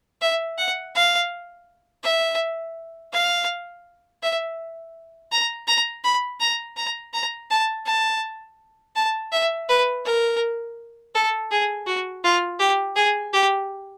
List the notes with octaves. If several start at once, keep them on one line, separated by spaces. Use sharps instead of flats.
E5
F#5
F5
E5
F5
E5
A#5
A#5
B5
A#5
A#5
A#5
A5
A5
A5
E5
B4
A#4
A4
G#4
F#4
F4
G4
G#4
G4